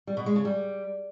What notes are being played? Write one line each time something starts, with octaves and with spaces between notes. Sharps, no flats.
G3
B2
G#3
C#3
G3